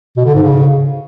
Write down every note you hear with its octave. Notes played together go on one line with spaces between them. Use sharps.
B2
D3
G#2
C#3